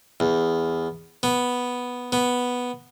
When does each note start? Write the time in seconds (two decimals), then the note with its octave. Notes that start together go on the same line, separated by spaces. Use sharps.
0.20 E2
1.23 B3
2.12 B3